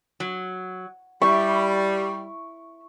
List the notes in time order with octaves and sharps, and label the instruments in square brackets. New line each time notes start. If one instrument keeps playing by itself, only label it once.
[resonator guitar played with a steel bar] F#3
[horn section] G3 [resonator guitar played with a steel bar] E4 [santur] C#6